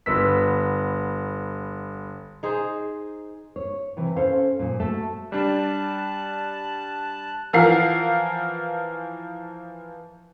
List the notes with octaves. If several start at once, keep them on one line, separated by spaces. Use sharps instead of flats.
G1 B3 B4 E6 B6
D#4 G#4 C5
C#5
C3 E3
C#4 A4 C5 F5
F#2 A#2
A3 F#4 A4 E5
G3 D4 A5 F#6
E3 F3 A#4 F5 F#5 C7